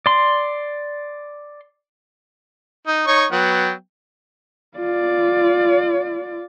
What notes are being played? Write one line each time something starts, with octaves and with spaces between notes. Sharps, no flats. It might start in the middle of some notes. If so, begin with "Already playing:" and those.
D5 C6
D#4
D#4 C#5 C#6
F#3 B3 G5
F4 D5